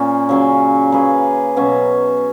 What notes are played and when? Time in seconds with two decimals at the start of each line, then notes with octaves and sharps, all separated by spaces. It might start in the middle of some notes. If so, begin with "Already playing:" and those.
Already playing: A#2 A#3 C#4
0.29 C#3 F#3 C#4
0.92 A#3 C#4 G#4 B4
1.57 B2 F#3 C#4